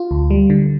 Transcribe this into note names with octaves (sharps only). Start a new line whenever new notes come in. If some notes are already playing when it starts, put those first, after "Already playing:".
Already playing: F4
D2
G3
D3